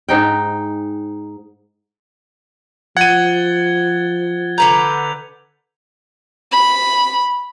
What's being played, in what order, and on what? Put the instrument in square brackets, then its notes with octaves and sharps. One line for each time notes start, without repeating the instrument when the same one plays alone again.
[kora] G#2 D#4 G5
[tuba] F3 [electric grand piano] F#5 D#7 [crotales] G#6 A6 G7
[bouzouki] D3 B4 A#5 [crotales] G6 F7
[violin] B5